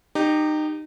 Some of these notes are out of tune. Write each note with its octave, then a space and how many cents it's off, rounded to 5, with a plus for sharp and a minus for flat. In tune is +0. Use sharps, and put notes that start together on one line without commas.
D#4 -25 G4 +0